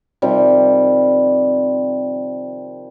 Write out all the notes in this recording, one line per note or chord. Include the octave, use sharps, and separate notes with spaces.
C3 D#3 F3 G3